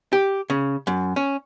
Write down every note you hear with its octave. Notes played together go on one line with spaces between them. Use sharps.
G4
C#3
F#2
C#4